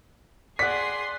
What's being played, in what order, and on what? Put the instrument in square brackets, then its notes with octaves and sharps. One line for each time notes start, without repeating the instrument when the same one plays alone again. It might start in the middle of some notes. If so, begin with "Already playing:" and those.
[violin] G#4 C6 [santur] D5 F#5 [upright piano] B6